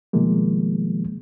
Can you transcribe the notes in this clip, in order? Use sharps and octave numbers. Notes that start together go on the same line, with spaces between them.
B2 D#3 F3 G3 G#3 A#3